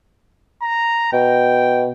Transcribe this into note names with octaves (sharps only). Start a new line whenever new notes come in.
A#5
B2 G5